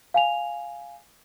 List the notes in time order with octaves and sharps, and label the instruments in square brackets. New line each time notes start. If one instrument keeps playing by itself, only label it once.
[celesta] F5 G#5 F7